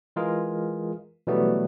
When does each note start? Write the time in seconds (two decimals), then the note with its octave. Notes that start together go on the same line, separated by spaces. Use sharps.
0.16 E3 G#3 F4 G#4 A#4
1.27 B2 E3 F#3 G3 A3 B3